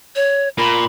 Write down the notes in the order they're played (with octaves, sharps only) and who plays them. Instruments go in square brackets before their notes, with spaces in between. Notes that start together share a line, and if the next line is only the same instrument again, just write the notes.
[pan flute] C#5
[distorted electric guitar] A#2 [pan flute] B5